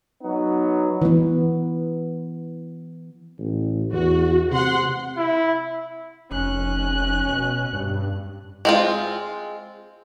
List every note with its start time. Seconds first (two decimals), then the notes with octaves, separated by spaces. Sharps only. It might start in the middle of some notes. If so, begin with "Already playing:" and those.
0.23 F#3 B3 D#4
1.02 E3 B3
3.39 A1
3.92 E2 F#4
4.51 C3 F#5 C6
5.18 E4
6.31 F1 C#4 F#6
7.28 B2
7.73 G2
8.65 G#3 C4 F4